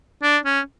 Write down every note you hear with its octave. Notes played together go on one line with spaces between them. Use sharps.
D4
C#4